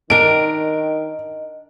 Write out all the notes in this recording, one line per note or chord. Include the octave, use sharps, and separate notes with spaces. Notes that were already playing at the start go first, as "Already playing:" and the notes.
D#3 D4 A#4 D#5 D7